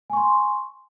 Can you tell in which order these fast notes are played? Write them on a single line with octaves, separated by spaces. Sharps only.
G#5 C#6 C6